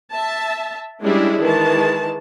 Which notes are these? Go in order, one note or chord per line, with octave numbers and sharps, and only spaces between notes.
E5 A5
G3 G#3 C#4 D4 E4 G#4
D#3 E3 G#3 A5